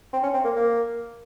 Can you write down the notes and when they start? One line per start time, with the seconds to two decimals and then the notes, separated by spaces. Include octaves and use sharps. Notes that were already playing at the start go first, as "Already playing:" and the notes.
0.13 C4
0.23 C#4
0.34 C4
0.44 A#3
0.56 A#3